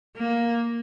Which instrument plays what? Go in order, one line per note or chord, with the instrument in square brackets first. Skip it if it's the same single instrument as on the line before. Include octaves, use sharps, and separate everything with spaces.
[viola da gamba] A#3